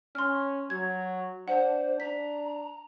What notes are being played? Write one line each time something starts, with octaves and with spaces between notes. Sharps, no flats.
C#4 C6 F6
F#3 G#6
D4 C5 F#5
D4 A#5 B6